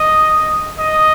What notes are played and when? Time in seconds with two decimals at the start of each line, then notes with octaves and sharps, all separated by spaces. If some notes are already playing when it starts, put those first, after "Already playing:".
Already playing: D#5
0.79 D#5